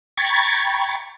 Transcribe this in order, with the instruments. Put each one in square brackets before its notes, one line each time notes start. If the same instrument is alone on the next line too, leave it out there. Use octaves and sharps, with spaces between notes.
[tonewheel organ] G5 A#5 B5 C#6 G#6 A6